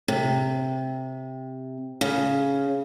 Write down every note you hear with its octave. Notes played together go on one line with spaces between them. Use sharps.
C3
C#3